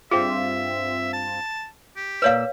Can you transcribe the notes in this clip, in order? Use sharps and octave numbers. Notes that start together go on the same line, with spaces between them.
G2 C4 F4 G#4 E5
A5
G4
A#2 B4 C#5 D5 F5 E6